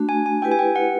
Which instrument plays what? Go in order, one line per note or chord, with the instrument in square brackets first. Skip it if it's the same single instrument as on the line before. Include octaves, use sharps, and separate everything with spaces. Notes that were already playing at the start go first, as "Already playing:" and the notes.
Already playing: [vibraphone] A3 D4 F#4
[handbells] G#5
G#5
[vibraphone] E4 G4 B4 [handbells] G5
[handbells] G#5
G5
F#5